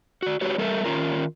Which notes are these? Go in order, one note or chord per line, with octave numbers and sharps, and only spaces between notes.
F#4 D5
F#4 G4 B4 C#5
G3 A4 A#4 D#5 E5
D#3 G3 C#4 F4 A#4